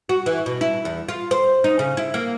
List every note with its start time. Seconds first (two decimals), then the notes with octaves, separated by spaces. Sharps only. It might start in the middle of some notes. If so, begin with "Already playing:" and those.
0.09 F#4
0.26 E3
0.46 B2
0.61 E4
0.85 E2
1.09 F4
1.31 C5
1.64 D#4
1.79 C#3
1.97 E4
2.14 A#3